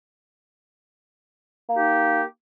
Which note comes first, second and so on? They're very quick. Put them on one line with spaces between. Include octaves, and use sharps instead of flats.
A#3 D#4 G4